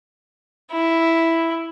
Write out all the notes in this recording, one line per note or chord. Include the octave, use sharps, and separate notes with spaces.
E4